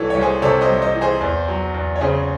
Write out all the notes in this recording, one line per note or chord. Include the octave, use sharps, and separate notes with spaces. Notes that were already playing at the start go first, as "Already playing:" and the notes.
Already playing: C2 E3 A4 C#5
C2 C#5
G#4 C5
C3 A4 C#5
C5 D#5
C2
C5 D#5
E3
G#4 C5
E2
F#3
E2
C#5
C#3 G#4 C5